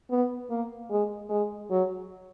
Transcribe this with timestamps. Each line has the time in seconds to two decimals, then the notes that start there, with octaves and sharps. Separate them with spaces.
0.10 B3
0.50 A#3
0.90 G#3
1.29 G#3
1.70 F#3